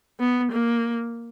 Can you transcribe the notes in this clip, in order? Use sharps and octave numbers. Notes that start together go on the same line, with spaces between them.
B3
A#3